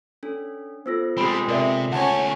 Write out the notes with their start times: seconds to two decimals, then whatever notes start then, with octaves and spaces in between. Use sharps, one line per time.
0.23 C#4 D4 A4
0.86 B3 F4 A4 C5 E6 A#6
1.17 G3 G#3 C4 B5
1.48 C3 A#4 D5 E5
1.92 D2 C#4 F#5 G#5 A5